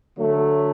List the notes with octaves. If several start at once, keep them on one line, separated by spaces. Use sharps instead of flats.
D3 F#3 A3